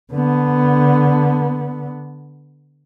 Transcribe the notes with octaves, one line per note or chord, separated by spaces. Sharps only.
D3 B3